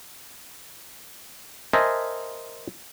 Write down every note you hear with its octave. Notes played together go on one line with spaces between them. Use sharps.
A#4 C5 D#5 E5 G#5 A5